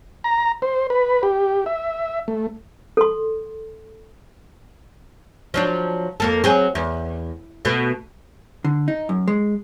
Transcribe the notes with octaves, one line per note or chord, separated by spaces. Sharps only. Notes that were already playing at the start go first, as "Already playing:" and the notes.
A#5
C5
B4
G4
E5
A3
A4 C6
F3 F#3 D4
F2 A#3 A4
F#3 C4 G#4
E2
B2 A3
D3
D#4
F#2
G#3